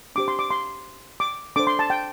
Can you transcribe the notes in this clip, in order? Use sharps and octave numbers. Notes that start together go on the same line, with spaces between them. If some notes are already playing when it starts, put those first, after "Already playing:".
D4 G4 C5 D6
C6
D6
C6
D6
D4 A4 C5 D6
C6
A5
G5